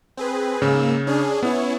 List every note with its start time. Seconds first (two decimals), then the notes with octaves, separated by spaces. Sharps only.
0.17 C4 G#4 B4
0.62 G#2 C#3 A#3 E6
1.07 C#4 D4 G#4
1.43 B3 C#4 E4 C#5